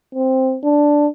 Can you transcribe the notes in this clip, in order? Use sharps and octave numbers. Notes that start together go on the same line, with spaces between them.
C4
D4